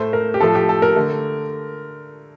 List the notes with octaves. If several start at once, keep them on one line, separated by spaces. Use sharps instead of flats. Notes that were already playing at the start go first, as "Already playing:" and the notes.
Already playing: A2 A3 C5
A#4
G4
A2 F3 A3 A4
G4
A4
A#4
D3 A3